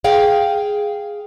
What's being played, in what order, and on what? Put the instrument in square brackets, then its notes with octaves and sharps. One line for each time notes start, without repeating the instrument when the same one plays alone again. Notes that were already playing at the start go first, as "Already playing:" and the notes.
[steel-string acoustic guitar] G#4 F5 G5